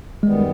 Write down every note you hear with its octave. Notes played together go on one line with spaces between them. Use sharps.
F#2 D#3 G3 G#3 B3